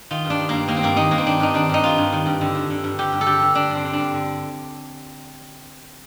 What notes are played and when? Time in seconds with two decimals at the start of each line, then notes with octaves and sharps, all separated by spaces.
0.11 D#3 F4
0.25 G2
0.30 D4
0.40 D#3
0.49 G2 A#3
0.68 D#3 A#3
0.77 C4
0.83 G2 A#3
0.96 D#3 D#4
1.11 G2 A#3
1.18 C4
1.26 D#3 D4
1.40 G2 D#4
1.54 D#3 D4
1.69 G2 D#4
1.83 D#3 F4
1.98 G2
2.13 D#3
2.26 G2
2.41 D3
2.55 G2
2.70 D3
2.84 G2
2.98 D3 G4
3.13 G2
3.21 A4
3.26 D3 G4
3.42 G2
3.55 D3 D4
3.70 G2 C4
3.85 D3
3.93 G2 D4
4.14 D3